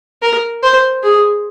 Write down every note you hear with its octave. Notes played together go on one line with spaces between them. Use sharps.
A#4
C5
G#4